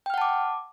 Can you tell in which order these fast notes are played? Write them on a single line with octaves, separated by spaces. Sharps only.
G5 F6 F#5 A5 D6